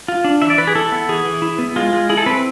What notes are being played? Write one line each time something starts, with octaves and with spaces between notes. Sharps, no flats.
F4
D4
E3 E5
D5
E3 B4
G#4
E4 A4
B3
E3 G#4
E3
E4
B3
G#3 F4
G#3
E4 G#4
A4
C4 B4